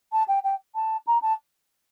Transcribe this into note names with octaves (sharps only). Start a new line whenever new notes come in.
A5
G5
G5
A5
A#5
A5